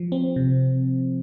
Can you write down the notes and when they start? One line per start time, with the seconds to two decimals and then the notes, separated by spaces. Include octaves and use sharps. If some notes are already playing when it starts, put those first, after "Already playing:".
Already playing: F3
0.12 C4
0.36 C3